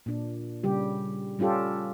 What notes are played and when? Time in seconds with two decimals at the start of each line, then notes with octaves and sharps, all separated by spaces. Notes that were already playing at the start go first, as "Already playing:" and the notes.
0.06 A#2 D4
0.64 C#3 G3 G4
1.39 G3 C#4 F4 G4 A4